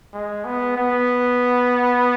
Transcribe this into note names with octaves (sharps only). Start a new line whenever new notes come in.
G#3
B3
B3